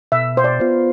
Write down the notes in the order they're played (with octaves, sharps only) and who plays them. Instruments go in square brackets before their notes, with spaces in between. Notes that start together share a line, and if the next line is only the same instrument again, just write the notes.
[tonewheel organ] B2 [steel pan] E5
[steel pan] C5
D5
[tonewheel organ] B3 F4 C5